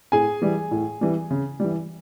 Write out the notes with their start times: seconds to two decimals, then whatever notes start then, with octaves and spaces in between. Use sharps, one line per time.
0.12 A2 G#4 G#5
0.42 E3 G3
0.71 A2
1.01 E3 G3
1.31 C#3
1.60 E3 G3